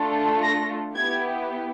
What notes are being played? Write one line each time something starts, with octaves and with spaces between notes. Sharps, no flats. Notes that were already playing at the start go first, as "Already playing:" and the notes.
Already playing: A3 D4 F4 A4
A#6
B3 E4 G4 G#6